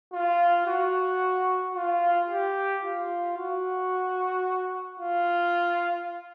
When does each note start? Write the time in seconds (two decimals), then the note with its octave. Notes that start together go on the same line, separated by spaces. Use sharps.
0.13 F4
0.67 F#4
1.75 F4
2.29 G4
2.84 F4
3.37 F#4
5.00 F4